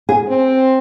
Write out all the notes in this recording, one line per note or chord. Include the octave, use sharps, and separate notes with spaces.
G#4
C4